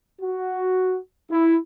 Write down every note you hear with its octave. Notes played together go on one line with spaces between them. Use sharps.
F#4
E4